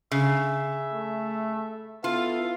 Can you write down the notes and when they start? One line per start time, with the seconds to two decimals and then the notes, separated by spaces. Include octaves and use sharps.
0.11 C#3 E5
0.93 A3
2.04 B3 E4 F4 A4 F5